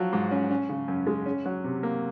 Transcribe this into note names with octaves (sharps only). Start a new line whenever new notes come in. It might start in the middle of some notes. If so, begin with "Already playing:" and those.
Already playing: F3 F#3 F#4
G#2
C#4
C#4
C#3
F#2
G#3
C#4
F#3
C3
A#3